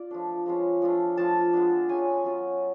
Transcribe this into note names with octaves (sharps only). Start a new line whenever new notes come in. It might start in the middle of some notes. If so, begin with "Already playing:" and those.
Already playing: F4 D5
F3 A3 D4
F3 G#3 C#4 F4
F3 A3 D4 F4
F3 A3 F4 A5
G#3 B3 D4
G#3 C#4 F4 G#5
F#3 C#4 F4